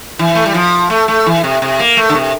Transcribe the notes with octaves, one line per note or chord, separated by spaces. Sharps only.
E3
A3
G3
F3
A3
A3
E3
C3
C3
A#3
A3
D3
C3